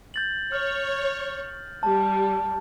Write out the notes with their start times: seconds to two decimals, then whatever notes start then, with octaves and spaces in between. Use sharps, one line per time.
0.14 G6 A6 F#7
0.52 C#5 F6
1.83 G3 A5